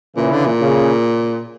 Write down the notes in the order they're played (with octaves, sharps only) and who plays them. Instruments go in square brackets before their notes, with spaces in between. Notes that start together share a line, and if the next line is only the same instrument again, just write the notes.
[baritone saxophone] A#2 [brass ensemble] C#3 E3
[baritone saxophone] D3
A#2
[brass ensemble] C#3